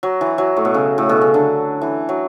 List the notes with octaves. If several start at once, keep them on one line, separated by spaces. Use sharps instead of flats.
F#3
E3
F#3
A2
B2
C#3
A2
B2
C#3
D3
E3
F#3